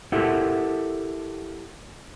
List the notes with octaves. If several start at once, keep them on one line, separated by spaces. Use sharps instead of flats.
E4 G4 A4 A#4 E5 F#5